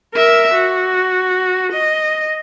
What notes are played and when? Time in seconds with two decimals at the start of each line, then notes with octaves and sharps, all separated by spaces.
0.14 A#4 E5
0.54 F#4
1.73 D#5